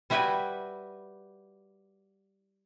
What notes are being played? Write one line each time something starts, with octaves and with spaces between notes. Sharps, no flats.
G3 E4 F#4 B4 G5 G#5